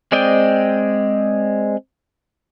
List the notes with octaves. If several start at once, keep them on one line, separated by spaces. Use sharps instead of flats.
G#3 C4 D5 D#5 G5